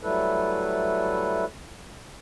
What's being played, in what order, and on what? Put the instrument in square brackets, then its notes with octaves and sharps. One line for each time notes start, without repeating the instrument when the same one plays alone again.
[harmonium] F#3 G3 A3 E4 A4 B4